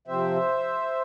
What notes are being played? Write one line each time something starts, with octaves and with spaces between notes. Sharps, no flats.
C3 F3 C4 C5 E5